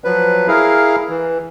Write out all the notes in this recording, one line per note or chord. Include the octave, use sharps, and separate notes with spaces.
F3 F#3 B4
E4 G#4 A#4 F5
E3